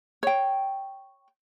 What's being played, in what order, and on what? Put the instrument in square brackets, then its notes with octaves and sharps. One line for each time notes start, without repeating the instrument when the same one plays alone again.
[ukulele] C#5 G5